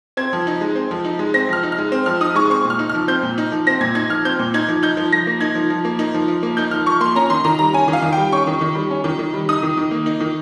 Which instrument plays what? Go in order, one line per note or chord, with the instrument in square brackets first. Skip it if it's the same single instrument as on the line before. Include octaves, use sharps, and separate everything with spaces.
[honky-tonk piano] C4 G#6
F3
D#4
G#3
C4
F3
D#4
G#3
C4 A#6
F3 F6
D#4
F6
G#3
C4
F3 F6
D#4 D#6
G#3 C#6
C4 C#6
A#2
F6
D#4
F6
F3
C4 G6
A#2
D#4
F3
C4 A#6
A#2 G#6
D#4 G#6
F3 F6
C4 G6
A#2
D#4 G#6
F3
D#4 G6
F3
F3 A#6
A#3
D#4 G#6
F3
F3
A#3
D#4
F3
F3
A#3
D#4 G6
F3 F6
F3 C#6
A#3 C6
C#4 A#5
D#3 C6
D#3 A#5
G3 A#5
C#4 G#5
D#3
F5
D#3
G5
G3
C#4 C#6
D#3
D#3
G3
C#4
D#3
D#3
G3
D#4 D#6
D#3
D#3
A#3
D#4
D#3